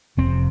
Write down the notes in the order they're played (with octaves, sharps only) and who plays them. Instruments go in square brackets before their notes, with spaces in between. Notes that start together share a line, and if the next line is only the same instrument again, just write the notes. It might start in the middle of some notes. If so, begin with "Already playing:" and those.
[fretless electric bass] F1 F2 C3 C4